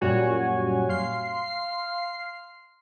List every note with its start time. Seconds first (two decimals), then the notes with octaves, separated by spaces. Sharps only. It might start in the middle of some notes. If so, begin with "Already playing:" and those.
0.01 F#2 A#2 G3 F#4 C#5 G#5
0.89 F5 C6 C7